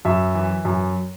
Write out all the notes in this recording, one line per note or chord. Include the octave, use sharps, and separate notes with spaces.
F#2 E5
E3
F#2